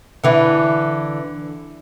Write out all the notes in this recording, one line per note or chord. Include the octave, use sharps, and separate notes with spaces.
D3 E3 E4